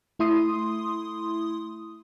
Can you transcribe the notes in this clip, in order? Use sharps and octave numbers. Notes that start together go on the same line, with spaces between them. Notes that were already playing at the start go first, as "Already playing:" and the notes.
A3 E4 C6 D#6